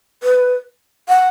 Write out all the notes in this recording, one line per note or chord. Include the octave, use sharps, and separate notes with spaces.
B4
F#5